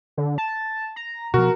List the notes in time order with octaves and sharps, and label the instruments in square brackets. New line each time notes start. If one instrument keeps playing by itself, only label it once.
[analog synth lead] D3
A5
A#5
[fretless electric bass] B2 F3 [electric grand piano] F#4 [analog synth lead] A#4